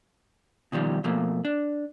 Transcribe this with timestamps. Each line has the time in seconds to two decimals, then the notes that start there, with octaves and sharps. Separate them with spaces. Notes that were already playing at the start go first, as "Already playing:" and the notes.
0.72 B2 D#3 F3 G3
1.04 B2 F3 A3 A#3
1.45 D4